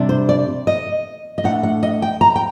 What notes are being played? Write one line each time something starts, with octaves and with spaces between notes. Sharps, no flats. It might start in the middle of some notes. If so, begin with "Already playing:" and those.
Already playing: C3 G3 D4
C5
D5
D#5
D#5
A2 A3 D4 F#5
F#5
D#5
G5
A#5
G5